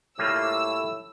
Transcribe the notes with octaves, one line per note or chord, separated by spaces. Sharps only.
A2 G3 A#3 F4 E6